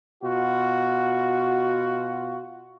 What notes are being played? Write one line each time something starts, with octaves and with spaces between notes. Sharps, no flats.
B2 F4 F#4